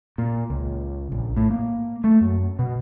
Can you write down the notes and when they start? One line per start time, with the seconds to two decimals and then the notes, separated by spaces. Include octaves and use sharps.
0.18 A#2
0.50 C#2
1.12 A#1
1.37 A2
1.50 A#3
2.04 A3
2.21 F#2
2.59 B2